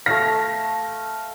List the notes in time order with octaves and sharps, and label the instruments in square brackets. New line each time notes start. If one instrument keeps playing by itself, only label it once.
[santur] A3 F5 [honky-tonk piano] A#6